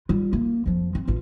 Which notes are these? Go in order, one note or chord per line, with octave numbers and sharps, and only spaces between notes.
G3 F4
A#3
F2 F3
C4
A1 F4